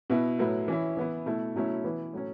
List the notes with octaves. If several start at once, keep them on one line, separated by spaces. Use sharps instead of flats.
B2 B3 E4
A2 F#3 B3 E4
E3 C#4 E4
E3 B3 E4
B2 A3 E4
B2 F#3 A3 C#4 E4
E3 B3 E4
A2 F#3 C#4